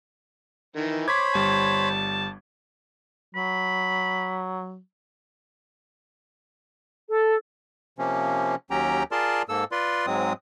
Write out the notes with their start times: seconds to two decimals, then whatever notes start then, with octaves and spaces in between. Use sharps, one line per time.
0.76 D#3 E3
1.08 C5 C#5 B5 D6 G#6 B6
1.35 G1 G3 A5
3.35 F#3 B5
7.08 A4
7.99 C3 F3 A#3 C#4
8.71 D#2 F#3 C#4 G4 G5 A#5
9.12 F4 G#4 A#4 D5 A5 C6
9.49 G#2 A#3 A4 E6
9.72 F4 B4 D5 C6
10.07 G#2 F#3 G#3 C4 D#6